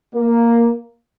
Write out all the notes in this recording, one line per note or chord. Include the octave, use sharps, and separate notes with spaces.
A#3